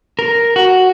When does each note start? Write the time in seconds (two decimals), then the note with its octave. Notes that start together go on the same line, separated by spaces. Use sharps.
0.19 A#4
0.56 F#4